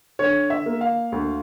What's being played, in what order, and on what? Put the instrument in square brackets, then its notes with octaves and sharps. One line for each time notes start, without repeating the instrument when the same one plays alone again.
[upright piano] D3 C#5
E5
A#3
F5
D2